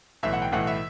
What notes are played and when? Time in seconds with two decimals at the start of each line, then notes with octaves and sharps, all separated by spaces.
0.23 B1 A2 E3 E5
0.33 F#5
0.42 G5
0.52 B1 A2 E3 F#5
0.67 E5